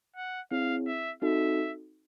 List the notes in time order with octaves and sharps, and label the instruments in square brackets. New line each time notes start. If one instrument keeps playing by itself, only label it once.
[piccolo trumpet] F#5
[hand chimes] C4 E4 G#4 C#5 [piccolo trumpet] F5
[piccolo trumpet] E5
[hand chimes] C4 D#4 F#4 A4 [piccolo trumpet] E5